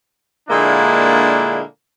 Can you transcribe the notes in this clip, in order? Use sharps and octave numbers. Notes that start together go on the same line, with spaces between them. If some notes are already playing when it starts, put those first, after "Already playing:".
A#2 D3 G#3 A#3 D4 E4